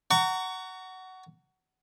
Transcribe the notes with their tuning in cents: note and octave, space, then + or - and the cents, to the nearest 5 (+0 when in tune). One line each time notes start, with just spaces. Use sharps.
F#5 +15 A#5 -20 C#6 +25